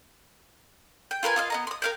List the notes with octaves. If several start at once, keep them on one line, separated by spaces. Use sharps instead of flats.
G5
F4 A#4 B4 G#5
F4 D#5 F5
B3 D#5 A#5
C6 D#6
A#4 F5 G5